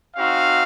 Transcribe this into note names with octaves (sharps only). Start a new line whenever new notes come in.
C4 D#4 F#4 F5